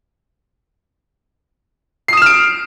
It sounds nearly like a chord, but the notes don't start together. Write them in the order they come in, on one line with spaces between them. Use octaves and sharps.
C7 D#6 E7 F6 D7